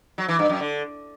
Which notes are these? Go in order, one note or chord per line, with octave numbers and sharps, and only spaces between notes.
F#3
E3
G2
F#2
D3